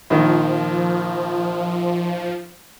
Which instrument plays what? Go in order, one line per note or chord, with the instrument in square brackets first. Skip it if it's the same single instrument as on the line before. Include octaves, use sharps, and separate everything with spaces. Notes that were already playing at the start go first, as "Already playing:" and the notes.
[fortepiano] A#1 D#3 [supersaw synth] F3